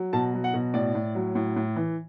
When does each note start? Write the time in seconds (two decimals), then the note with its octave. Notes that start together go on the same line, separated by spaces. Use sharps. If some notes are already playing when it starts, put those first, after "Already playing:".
Already playing: F#3
0.13 B2 A5
0.34 F#3
0.44 F#5
0.54 B2
0.74 A2 D5
0.95 A2
1.15 F#3
1.35 A2
1.56 A2
1.76 E3